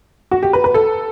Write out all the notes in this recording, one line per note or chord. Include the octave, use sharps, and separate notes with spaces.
F#4
G4
B4
B4
A4